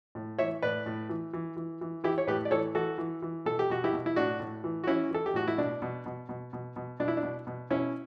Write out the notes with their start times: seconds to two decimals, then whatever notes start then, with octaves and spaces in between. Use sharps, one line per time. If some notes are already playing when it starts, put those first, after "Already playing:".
0.15 A2
0.39 E3 C#5 E5
0.62 A2 B4 D5
0.86 A2
1.09 E3
1.33 E3
1.57 E3
1.81 E3
2.04 E3 E4 G4
2.18 C#5
2.27 A2 G4 B4
2.45 D5
2.51 E3 A4 C#5
2.75 E3 F#4 A4
2.98 E3
3.22 E3
3.46 B2 A4
3.59 G4
3.70 B2 F#4
3.84 E4 G4
3.93 B2
4.06 E4
4.16 A2 D4 F#4
4.40 A2
4.64 E3
4.84 F#4
4.87 E3 C#4 E4
5.11 E3 A4
5.26 G4
5.34 A2 F#4
5.48 E4
5.58 B2 D4
5.82 B2
6.06 B2
6.29 B2
6.53 B2
6.76 B2
7.00 B2 D4
7.08 E4
7.17 D4
7.23 B2
7.47 B2
7.70 B2 C#4 E4